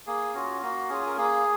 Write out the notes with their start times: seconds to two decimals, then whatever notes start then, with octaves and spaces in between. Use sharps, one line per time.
0.07 A#3 G#4
0.34 C#4 F4 F#4
0.62 A#3 F#4
0.89 C#4 F4 G#4
1.06 A#4
1.17 A#3 G#4